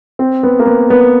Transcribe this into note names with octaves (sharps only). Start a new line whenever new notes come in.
C4
B3
A#3
B3
B3